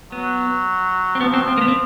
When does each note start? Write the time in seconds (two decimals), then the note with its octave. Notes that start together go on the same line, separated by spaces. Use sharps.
0.12 F#3 B3
1.15 C4
1.21 F3 B3
1.30 F#3 C4
1.41 F3
1.48 C4
1.57 A#3
1.61 B3
1.68 C4